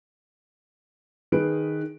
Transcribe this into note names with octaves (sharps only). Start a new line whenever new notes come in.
D#3 G#4 B4 D7